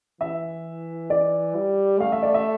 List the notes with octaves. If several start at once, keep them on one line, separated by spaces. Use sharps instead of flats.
E3 E5
D5
G3
A3 F5
E5
D5
E5